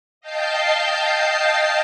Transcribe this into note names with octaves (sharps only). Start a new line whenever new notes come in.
D#5 F5 G5 A5 G6 C7